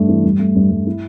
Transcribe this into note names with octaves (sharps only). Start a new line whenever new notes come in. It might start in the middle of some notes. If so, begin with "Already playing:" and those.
Already playing: G2 A3 D4
E3
G2
A3
G2
G2
E4